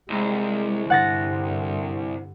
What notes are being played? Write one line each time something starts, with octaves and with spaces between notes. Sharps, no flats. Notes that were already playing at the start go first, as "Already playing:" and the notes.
C2 G#3
G2 D3 F#5 A6 A#6